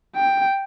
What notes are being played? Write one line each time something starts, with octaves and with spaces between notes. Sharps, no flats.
G5